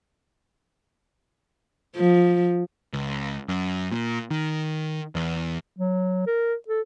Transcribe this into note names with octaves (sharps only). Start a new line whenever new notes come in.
F3
C#2
F#2
A#2
D#3
E2
F#3
A#4
A4